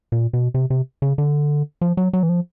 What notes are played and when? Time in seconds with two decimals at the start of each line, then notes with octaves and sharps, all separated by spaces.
0.12 A#2
0.33 B2
0.54 C3
0.70 C3
1.02 C#3
1.18 D3
1.81 F3
1.97 F#3
2.13 F#3
2.23 E3
2.29 F3